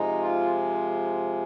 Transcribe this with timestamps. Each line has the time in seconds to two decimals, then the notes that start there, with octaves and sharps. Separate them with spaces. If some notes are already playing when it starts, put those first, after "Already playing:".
Already playing: C3 F3 G#3 D#4
0.18 F4